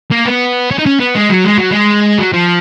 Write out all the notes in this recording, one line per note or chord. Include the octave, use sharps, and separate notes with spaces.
A#3
B3
C#4
D#4
C#4
B3
G#3
F#3
G#3
F#3
G#3
F#3
F3